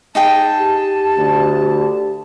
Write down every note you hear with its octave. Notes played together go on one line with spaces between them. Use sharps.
D#4 G#4 G5 A5
G4
D2